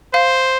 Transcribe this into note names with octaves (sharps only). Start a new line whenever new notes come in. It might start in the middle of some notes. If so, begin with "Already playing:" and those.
C5 F5